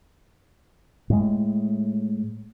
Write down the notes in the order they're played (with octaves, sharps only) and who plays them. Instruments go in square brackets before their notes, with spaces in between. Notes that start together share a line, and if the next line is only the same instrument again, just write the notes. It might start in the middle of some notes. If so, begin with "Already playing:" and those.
[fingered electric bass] A2 G#3